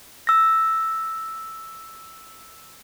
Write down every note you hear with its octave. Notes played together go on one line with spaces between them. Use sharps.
E6 A#6